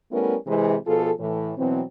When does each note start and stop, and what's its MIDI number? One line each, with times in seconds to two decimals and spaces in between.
0.12 0.36 55
0.12 0.36 57
0.12 0.36 59
0.12 0.36 61
0.12 0.36 64
0.12 0.36 70
0.47 0.74 48
0.47 0.74 52
0.47 0.74 56
0.86 1.11 47
0.86 1.11 53
0.86 1.11 65
0.86 1.11 68
0.86 1.11 69
1.19 1.51 45
1.19 1.51 52
1.57 1.82 47
1.57 1.82 52
1.57 1.82 54
1.57 1.82 60